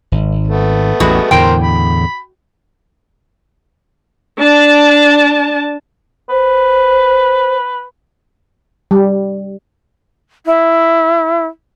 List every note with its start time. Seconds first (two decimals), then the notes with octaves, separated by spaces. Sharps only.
0.12 G#1
0.47 A3 B3
1.00 A1 E2 G3 G#3 F#4
1.31 E2 A2 D3 A#4 C5 G5
1.62 B5
4.38 D4 A5
6.30 B4 C5
8.91 G3
10.46 E4